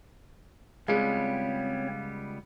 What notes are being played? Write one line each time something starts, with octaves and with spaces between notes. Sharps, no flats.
C#2 G3 G#3 B3 C4 C#5 F5